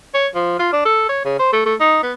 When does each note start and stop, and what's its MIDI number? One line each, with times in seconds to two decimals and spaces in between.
0.14 0.28 73
0.35 0.57 53
0.59 0.72 65
0.73 0.84 62
0.85 1.05 69
1.09 1.23 73
1.25 1.36 49
1.39 1.52 72
1.53 1.63 57
1.66 1.75 57
1.80 2.02 63
2.03 2.12 59